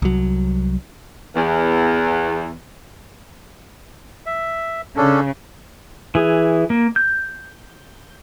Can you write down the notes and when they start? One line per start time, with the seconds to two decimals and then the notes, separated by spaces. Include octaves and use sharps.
0.02 C2 F#3
1.35 E2
4.26 E5
4.96 C#3 C#4 D4 A4
6.15 E3 G#4
6.70 A#3
6.96 G6